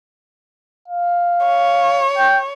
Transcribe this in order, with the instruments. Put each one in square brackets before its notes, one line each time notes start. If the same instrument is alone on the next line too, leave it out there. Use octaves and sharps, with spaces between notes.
[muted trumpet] F5
[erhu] C#5
[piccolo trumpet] G5